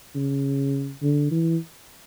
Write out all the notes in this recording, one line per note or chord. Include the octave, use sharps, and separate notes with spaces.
C#3
D3
E3